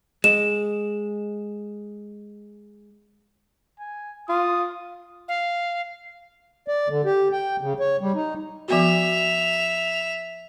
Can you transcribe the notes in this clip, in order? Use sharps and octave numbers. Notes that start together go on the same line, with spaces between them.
G#3 E7
G#5
F4 D#6
F5
D5
D3
G4
G5
C#3
C#5
G3
D#4
F3 B3 F#4 E5 F7